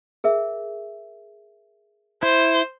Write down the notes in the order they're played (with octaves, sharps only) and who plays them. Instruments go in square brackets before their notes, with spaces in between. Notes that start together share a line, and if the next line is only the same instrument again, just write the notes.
[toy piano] G#4 A#4 E5
[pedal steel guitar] E4 [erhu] C5